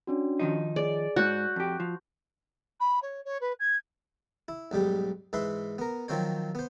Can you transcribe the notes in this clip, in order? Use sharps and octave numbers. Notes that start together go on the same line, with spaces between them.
C#4 D4 F#4
D#3 F3 D#4
G#4 D5
G#2 F#4 F#6 G6
F2 G4
F3
B5
C#5
C#5
B4
G#6
E4
B1 G#2 G3 G4
G#2 E3 B4 E5 B5 C6
B3 A#4
D#3 F3 F#3 C4 C5 C#5
B3 C5